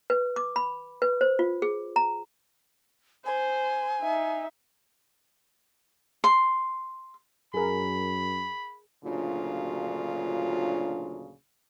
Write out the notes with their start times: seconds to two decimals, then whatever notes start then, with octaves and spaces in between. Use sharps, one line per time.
0.10 B4
0.36 D6
0.56 B5
1.02 B4
1.21 C5
1.39 F4
1.62 G#4
1.96 A#5
3.26 C5 G#5
4.02 D#4 E5
6.24 C6
7.54 F#2 G#4 A#4 B5
9.05 D2 A#2 C#3 F#3 D4 F4